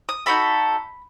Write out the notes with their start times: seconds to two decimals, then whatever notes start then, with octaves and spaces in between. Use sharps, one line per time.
0.09 D#6
0.26 D#4 F#4 A4 B5